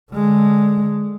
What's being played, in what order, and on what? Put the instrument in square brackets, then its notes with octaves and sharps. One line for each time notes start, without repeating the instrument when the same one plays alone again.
[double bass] D3 G#3